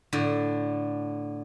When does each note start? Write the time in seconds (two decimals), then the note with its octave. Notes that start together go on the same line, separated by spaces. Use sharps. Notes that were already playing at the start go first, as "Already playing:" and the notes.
0.13 A2 D3